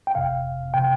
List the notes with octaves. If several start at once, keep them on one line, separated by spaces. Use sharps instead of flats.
G5
G1 F2 C3 F5
C3 G5